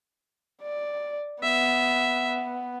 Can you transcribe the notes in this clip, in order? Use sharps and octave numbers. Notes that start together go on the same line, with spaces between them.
D5
B3 E5